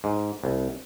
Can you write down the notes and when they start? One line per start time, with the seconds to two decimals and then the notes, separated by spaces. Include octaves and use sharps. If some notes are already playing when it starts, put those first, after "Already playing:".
0.04 G#2
0.44 C2